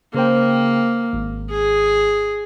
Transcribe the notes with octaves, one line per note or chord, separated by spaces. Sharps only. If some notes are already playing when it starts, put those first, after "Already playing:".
C#3 A#3 C5 G5
G#1
G#4